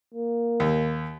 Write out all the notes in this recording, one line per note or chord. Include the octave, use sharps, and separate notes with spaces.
A#3
D#2